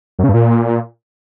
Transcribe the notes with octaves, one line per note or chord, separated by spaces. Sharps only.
F#2
C#3
G2
A#2